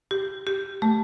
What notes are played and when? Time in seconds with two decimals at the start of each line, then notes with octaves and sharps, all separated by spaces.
0.11 G4
0.47 G4
0.82 A3